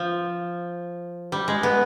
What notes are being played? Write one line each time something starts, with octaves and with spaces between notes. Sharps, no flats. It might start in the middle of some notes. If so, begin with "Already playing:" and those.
Already playing: F3
G3
G#3
B3